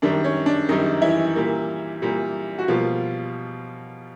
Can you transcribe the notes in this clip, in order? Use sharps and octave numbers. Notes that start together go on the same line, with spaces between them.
F#2 D#3 G3 D4
C#4
D4
F#2 D#3 G3 D#4
E3 E4
A#2 G3 A#3
A#2 G3 A#3
F#4
B2 F3 G3 A#3 F4